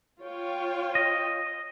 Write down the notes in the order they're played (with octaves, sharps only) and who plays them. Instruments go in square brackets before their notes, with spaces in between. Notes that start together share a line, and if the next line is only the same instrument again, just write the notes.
[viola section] F4 C#5 G5
[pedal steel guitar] D#5